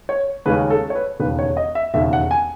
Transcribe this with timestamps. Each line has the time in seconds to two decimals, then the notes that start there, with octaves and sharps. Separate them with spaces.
0.09 C#5
0.46 D#2 C#3 G#3 C#4 B4
0.70 A4
0.90 C#5
0.95 B4
1.19 E1 D#2 C#3 B4
1.39 C#5
1.57 D#5
1.75 E5
1.94 E1 D#2 C#3 E5
2.13 F#5
2.31 G#5